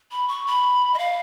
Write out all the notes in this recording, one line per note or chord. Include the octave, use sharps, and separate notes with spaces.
B5
C#6
B5
D#5
F5